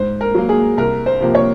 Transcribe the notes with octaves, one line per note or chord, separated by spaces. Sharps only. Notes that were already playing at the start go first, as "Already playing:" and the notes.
Already playing: G#2 C5
A#4
F#3 A#3
G#4
C2 A#4
C5
C3 F3 A#3
C#5